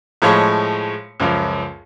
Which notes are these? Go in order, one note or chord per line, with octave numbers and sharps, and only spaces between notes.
A2 F3 G#3 C#5 B5 C#6
C#2 F#2 F3